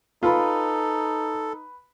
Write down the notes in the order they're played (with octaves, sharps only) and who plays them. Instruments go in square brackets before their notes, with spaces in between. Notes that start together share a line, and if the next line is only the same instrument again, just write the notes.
[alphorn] D#4 [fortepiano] F4 [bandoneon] A4 [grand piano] B4 B5